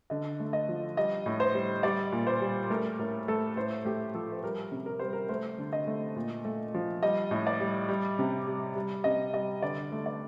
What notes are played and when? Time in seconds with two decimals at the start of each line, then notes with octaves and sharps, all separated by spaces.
0.10 D3 D#5
0.40 A3
0.53 D#5
0.69 F3
0.97 G3 D#5
1.26 A2
1.40 C5
1.54 G3
1.83 G3 D5
2.12 A#2
2.27 C5
2.41 G3
2.70 A3 A#4
2.99 A2 A#4
3.28 A3 A4
3.57 A2 C5
3.85 A3 G4
4.14 F3 A4
4.32 C5
4.43 G3 A#4
4.72 C3
4.86 A#4
4.99 G3 C5
5.13 A#4
5.29 A3 C5
5.58 D3
5.73 D#5
5.87 A3
6.16 A#2
6.45 A3
6.74 F3
7.03 G3 D#5
7.31 A2
7.47 D5
7.60 G3
7.89 G3
8.19 C3
8.47 G3
8.75 G3
9.04 C3 D#5
9.33 G3 D#5
9.62 D3 D5
9.92 A3
10.06 D5